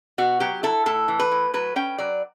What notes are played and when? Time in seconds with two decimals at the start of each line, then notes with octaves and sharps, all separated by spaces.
0.18 B2 F#4
0.40 F#3 G4
0.63 E4 A4
0.86 A2 A4
1.08 E3
1.19 B4
1.31 A2
1.54 F#3 B4
1.76 C#4 G5
1.98 F#3 D5